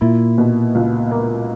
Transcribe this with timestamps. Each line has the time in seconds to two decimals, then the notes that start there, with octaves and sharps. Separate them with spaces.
0.01 A#2 E4
0.38 B2
0.75 C#2
1.11 A#3